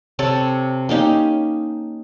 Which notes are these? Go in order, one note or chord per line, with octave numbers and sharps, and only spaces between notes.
C3 A4 C#5
A#3 C#4 D#4 G4